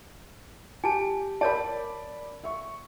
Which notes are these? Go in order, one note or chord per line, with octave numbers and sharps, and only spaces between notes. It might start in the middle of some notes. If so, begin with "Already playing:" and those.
G4 G#5 A5
A#4 C#5 D5 A5 B5
E5 C#6